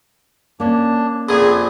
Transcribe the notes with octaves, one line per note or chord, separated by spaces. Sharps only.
A#3 C#4 D4
A#1 F2 A#2 G#4 G#5